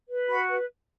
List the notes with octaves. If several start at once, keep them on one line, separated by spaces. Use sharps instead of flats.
B4
F#4 B5
B4